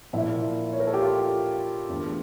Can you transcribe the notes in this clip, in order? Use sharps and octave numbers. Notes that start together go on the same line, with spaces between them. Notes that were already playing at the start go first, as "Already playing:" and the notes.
A#2 F3 A#3 E4
C#5
A#4
A4
G4
F4
E2 D3 A3